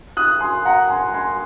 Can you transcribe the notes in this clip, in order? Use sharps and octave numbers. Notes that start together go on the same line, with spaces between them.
D#6 F#6
G#5 C6
F#5 A#5
G#5 C6
G#5 C6